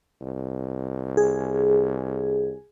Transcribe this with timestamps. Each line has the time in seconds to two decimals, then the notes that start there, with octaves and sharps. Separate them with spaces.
0.22 C2
1.17 G#4